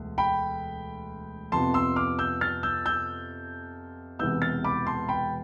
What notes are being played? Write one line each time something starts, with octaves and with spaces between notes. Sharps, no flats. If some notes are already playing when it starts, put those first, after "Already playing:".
Already playing: E1 D2
G5 B5
F2 C3 F3 B3 A5 C6
C6 E6
D6 F6
E6 G6
F6 A6
E6 G6
E6 G6
E1 E2 C3 E3 B3 E6 G6
F6 A6
B5 D6
A5 C6
G5 B5